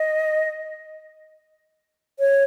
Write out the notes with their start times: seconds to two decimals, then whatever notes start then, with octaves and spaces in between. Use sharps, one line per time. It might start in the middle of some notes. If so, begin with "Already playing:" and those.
Already playing: D#5
2.19 C#5